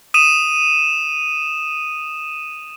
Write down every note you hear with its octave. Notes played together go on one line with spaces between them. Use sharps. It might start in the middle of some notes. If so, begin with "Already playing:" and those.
D#6 D#7 E7